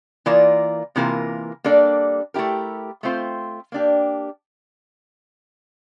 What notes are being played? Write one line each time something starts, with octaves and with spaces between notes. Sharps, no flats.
E3 A#3 F4 A#4 D5
C3 E3 A#3 F4 A#4
G3 A#3 D4 A4 D5
A3 E4 G4 A#4
A3 C4 F4 C5
A#3 D4 G4